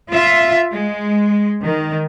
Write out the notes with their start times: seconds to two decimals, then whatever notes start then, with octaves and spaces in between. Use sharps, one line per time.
0.11 F4 E5
0.71 G#3
1.64 D#3